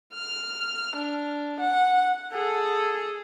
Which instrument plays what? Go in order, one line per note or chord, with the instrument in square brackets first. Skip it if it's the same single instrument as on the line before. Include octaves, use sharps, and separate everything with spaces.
[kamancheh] F6
D4
F#5
[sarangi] G#4 [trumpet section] A4